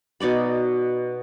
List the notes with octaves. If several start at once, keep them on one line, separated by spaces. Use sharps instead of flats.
B2 D#4 D5 B5